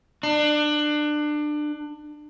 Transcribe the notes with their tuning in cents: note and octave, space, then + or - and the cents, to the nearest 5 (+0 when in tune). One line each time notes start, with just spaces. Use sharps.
D4 +25